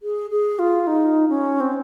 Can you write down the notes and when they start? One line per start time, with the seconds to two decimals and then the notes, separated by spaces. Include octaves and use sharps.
0.03 G#4
0.31 G#4
0.59 F4
0.87 D#4
1.29 C#4
1.60 C4